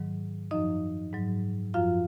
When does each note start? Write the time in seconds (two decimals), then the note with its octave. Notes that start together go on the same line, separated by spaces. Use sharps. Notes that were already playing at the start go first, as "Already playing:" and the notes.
Already playing: G#2 D#3 F#3
0.51 F#2 F3 D#4 D#5
1.13 G#2 F#3
1.74 F#2 F3 F4 F5